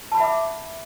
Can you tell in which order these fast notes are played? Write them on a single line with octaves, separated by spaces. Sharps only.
A5 B5 F#5 E5 D6